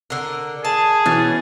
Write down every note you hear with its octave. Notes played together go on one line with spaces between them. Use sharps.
D3 A#4
G#4 A5
B2 E3 B3 C#4 A6